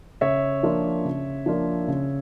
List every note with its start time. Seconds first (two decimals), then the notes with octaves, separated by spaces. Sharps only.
0.21 C#3 C#5 E5
0.63 F3 A#3 D4 F4
1.05 C#3
1.46 F3 A#3 D4 F4
1.88 C#3